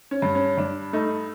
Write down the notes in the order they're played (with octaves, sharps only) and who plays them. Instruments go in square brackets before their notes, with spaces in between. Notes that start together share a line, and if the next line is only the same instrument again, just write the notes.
[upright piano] C#4
G2
C#4
G2 D4
A3 D#4